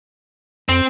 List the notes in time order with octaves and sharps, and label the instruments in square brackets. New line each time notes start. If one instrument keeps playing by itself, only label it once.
[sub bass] F2 [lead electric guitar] C4